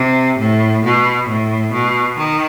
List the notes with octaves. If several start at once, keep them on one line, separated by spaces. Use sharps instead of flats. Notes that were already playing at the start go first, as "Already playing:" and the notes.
Already playing: C3
A2
B2
A2
B2
D#3